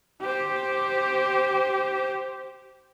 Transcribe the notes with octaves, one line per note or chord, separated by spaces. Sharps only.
G4 C5